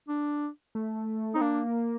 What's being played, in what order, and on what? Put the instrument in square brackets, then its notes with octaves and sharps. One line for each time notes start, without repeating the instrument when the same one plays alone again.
[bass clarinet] D4
[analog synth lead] A3
[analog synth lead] C4 [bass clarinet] D#4
[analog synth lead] A#3 [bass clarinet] D4